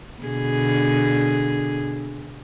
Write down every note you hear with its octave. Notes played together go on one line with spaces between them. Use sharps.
B2 D3 G#4